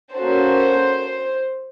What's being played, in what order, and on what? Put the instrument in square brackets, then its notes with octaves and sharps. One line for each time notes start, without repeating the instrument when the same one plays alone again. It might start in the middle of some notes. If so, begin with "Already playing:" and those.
[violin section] A#3 C#4 F#4 A4 C5